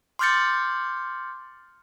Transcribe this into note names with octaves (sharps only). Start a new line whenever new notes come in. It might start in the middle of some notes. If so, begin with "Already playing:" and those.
C6 D6 F6 G6 A6 C#7